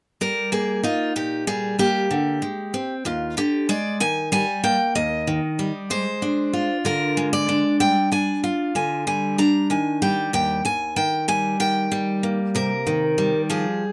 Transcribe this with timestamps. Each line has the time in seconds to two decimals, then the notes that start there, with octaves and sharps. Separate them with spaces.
0.21 G3 A#4
0.52 A#3 G#4
0.83 D#4 F4
1.16 A#2 G4
1.47 G3 G#4
1.79 A#3 G4
2.11 D3
2.42 G#3
2.74 C4
3.05 D#2 F4
3.37 D3 G4
3.69 G#3 D5
4.00 D#3 G#5
4.32 G3 G#5
4.64 A#3 G5
4.95 D#2 D#5
5.27 D#3
5.59 G3
5.90 G#3 C5
6.22 D4
6.53 F4
6.85 D3 A#4
7.17 G#3
7.33 D5
7.49 D4
7.80 G3 G5
8.12 D4 G#5
8.44 F4
8.75 D3 G#5
9.07 G3 G#5
9.38 D4 A#5
9.70 D#3 G#5
10.02 G3 G5
10.33 D#2 G5
10.65 D#2 G#5
10.96 D#3 G5
11.28 G3 G#5
11.60 D#3 G5
11.92 G3
12.23 A#3
12.55 C3 A#4
12.87 D#3
13.18 G3
13.50 F3 G#4